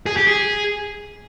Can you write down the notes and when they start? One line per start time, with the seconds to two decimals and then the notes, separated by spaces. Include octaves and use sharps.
0.06 G#4
0.17 G4
0.27 G#4